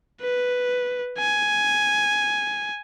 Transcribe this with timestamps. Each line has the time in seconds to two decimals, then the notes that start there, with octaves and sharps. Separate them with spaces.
0.22 B4
1.19 G#5